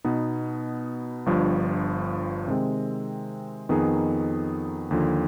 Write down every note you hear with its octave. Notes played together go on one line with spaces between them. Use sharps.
B2 B3 D#4
G1 G2 F3
C3 D#3 G#3 C4
F2 D#3 B3 D#4 G#4
D#2 D3 F3